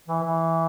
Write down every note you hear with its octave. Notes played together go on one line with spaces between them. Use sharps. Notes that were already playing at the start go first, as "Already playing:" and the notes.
E3
E3